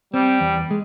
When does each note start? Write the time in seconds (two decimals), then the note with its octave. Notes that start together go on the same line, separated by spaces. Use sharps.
0.14 G3 C4
0.41 E2
0.71 G#3